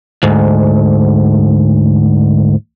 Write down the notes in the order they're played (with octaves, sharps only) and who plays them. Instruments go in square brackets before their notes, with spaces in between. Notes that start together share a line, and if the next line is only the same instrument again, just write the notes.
[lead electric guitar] D2 G#2